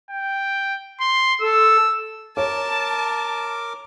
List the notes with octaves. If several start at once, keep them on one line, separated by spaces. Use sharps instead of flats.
G5
C6
A4 E6
A#4 C#5 A5 D6